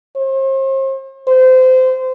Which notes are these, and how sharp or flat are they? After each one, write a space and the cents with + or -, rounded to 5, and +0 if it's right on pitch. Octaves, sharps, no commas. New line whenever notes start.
C5 +40
C5 -25